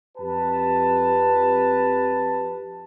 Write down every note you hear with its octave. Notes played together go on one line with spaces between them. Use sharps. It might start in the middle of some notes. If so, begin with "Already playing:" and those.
F2 G4 B4 A5